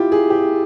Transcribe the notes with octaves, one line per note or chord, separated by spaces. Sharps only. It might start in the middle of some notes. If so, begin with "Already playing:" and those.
Already playing: E4 F4 G4
G#4
G4